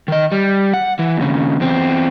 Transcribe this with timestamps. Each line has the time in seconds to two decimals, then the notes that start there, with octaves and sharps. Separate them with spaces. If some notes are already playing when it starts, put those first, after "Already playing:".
0.08 D#3 D#5
0.32 G3
0.74 F#5
0.99 E3
1.17 D#2 C#3
1.60 E2 C4